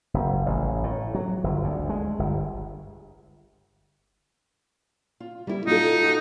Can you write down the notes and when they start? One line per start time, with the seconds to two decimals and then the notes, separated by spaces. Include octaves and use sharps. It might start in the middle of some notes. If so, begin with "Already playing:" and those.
0.14 F#1
0.46 A1
0.84 A2
1.15 F#3
1.44 G1
1.64 D2
1.89 G#3
2.19 G1
5.20 F4
5.47 G3 E4
5.67 D#4 F4 F#4 A4
6.04 F#4